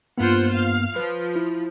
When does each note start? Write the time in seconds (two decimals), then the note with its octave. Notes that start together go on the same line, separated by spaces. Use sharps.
0.18 G2 A#3 B3 F4 C5 F#5
0.56 F5
0.96 F3 B4
1.36 E4